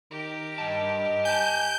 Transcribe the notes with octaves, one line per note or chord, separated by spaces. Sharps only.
D#3 G4 A#4
G2 D#5 A5
G#5 A5 G6